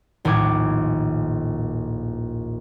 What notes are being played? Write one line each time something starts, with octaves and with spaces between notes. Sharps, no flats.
D#1 A#1 A2 D6 G#6